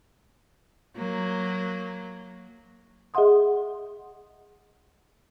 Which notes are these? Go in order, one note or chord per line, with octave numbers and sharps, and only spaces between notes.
F#3 A#3
G#4 D#5 E5 F#5 C6 D#6